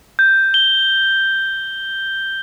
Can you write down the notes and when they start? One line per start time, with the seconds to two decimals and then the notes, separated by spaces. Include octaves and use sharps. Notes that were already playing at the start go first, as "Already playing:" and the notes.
0.19 G6
0.54 G7